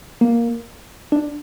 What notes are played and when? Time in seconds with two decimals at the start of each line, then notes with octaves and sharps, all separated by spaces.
0.21 A#3
1.12 D4